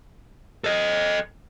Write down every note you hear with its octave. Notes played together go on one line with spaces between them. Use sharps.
A4 D#5